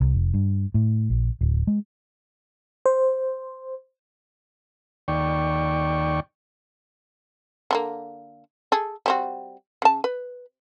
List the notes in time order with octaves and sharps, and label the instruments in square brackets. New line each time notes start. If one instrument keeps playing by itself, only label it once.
[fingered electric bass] C2
F1
G2
A2
A#1
D1
G#3
[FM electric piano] C5
[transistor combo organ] D#2 D5 G5 C#6
[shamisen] D3 F3 A#3
G#4 A4
G3 C4 F#4
C#3 A5
B4